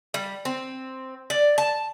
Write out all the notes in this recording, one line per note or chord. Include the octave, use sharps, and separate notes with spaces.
G3
C4
D5
A5